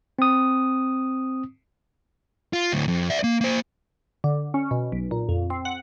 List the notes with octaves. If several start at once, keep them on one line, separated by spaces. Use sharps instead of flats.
C4 D#6
F4
D2 A2
F2
D5 E5
A#3
A#3 C5
D3
C#4
B2
B1
A#2
F2
C4
F#5